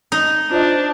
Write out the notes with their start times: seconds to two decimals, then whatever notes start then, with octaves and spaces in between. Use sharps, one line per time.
0.12 D#4
0.51 D4 F4 C5 D5 D#5